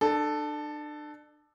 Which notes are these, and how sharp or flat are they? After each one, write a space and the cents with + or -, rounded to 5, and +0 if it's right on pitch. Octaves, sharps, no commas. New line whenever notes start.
D4 +35 A4 +0